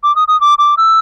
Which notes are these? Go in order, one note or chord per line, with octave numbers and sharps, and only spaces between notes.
D6
D#6
D#6
D6
D6
E6